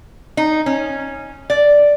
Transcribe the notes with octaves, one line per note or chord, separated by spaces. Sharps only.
D#4
C#4
D5